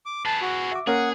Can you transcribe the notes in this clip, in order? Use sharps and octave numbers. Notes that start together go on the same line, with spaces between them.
D6
G#4 B4 A5
F#4
E5 D6
A#3 C#4 G#4 A#4 F#5